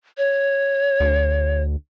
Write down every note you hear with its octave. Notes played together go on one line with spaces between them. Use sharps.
C#5
D2